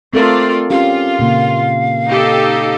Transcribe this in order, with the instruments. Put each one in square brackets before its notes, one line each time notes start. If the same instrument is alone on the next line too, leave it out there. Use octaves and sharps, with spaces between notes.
[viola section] A3 F4 D5 [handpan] C4 A4 A#4
[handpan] C#4 G4 [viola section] F4 [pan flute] F5
[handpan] A#2 C#3 A#3
[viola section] D#4 G4 A4